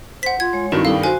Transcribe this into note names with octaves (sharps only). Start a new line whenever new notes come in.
C5 F#5 B6
F4 G#6
G#3 C#5
G2 D#3 C4 E4 F#4
G3 D#4 A4 F5
F#4 C5 G#5 C6